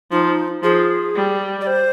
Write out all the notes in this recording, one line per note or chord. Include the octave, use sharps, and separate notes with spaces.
F3 D#4
F3 G#4
G3
D5
C5